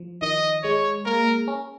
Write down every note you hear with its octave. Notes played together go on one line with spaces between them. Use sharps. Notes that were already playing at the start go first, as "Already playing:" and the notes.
Already playing: F3
D#3 D#5
G#3 C#5
A#3 A#4
C#4